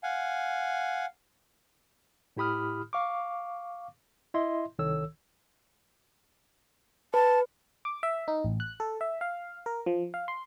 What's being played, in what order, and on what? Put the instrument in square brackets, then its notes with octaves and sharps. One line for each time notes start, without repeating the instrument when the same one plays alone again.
[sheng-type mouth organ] F5 F#5 G#5
[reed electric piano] A2 E4 G4 B5 D#6 F6
F5 C#6 D6
E4 D#5 E5 C6
C2 D#3 A4 C#5 E6
[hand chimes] B4 [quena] A5
[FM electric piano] D6
E5
D#4
A1
F#6
A4
E5
F5
A#4
F3
F5
C6